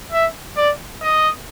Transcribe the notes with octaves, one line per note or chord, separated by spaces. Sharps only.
E5
D5
D#5